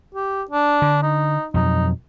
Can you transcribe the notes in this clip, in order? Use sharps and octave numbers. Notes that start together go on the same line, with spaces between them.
G4
D4
D3
D#4
F2 B2 F#3 D#4